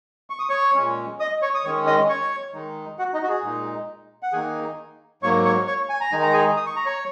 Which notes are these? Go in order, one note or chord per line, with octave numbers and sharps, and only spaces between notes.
C#6
D#6
C#5 C#6
A#2 G#3 C#4
D#5 D#6
C#5 C#6
D#6
D#3 G#3 C#4 C#5 C#6
D#5 D#6
C#5 C#6
D#3 G#3 D#4
F#4 F#5
D#4 D#5
F#4
G#4
A#2 G#3 D#4
F#5
D#3 A#3 D#4 G#4 G#5
G#2 F#3 A#3 C#5 C#6
C#5 C#6
C#5 C#6
G#5
A#5
D#3 G#3 D#4 G#5
A#5
G#4 G#5
D#6
C#6
A#5
C#5 C#6